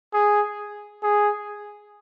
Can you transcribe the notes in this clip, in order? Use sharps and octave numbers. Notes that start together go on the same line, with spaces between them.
G#4
G#4